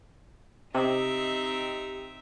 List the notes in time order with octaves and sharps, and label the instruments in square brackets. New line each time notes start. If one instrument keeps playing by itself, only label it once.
[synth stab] C3 [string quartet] C4 D#4 E5 [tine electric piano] G4 D#5 D#6